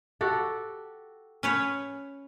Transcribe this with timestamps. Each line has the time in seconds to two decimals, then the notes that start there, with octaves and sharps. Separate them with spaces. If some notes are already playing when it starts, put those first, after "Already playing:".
0.21 F#4 G4 A4
1.43 C#4 B4 C#5